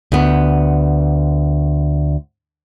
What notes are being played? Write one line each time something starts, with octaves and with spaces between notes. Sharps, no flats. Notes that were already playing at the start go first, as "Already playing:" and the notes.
D2 B3